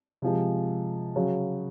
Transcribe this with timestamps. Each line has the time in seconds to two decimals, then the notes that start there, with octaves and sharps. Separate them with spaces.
0.22 C3 F3 G#3
1.16 C#3 F#3